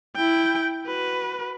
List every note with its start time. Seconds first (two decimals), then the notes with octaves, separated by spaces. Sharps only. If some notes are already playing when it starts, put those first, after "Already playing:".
0.16 E4 G5
0.85 F#4 B4